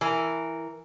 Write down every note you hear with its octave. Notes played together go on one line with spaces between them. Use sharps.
E3 A#4